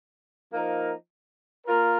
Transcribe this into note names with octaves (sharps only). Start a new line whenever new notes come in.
F3 A#3 D#4 A#4
A#3 F4 A#4